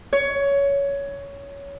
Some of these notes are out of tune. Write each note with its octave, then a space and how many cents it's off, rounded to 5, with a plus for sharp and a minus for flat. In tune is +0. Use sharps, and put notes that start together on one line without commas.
C#5 +15